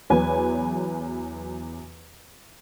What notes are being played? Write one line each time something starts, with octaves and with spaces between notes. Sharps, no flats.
E2 F#3 B4 G#5